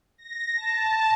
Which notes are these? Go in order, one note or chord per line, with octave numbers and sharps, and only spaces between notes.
A#6
A5